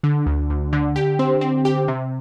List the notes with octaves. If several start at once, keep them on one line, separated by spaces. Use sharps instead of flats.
D3
D2
D2
D3
G4
C4
C4
G4
C3